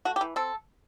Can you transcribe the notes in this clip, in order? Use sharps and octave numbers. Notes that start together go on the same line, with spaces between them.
A3 F#4
G4
E3
C4 A4